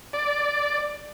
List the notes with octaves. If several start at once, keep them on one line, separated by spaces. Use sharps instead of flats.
D5